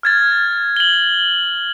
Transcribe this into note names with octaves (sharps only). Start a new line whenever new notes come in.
F6 G#6 A6
F#7 G7